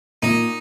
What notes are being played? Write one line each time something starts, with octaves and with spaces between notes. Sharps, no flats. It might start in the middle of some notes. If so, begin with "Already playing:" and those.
A#2 D#4